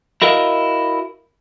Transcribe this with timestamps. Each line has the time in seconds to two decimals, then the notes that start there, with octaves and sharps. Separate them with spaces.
0.22 E4 F#4 A#4 D#5 F5